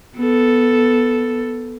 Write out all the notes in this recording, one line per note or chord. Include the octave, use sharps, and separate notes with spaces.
B3 A4